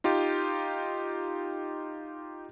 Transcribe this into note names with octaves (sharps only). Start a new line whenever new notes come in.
D#4 F4 G4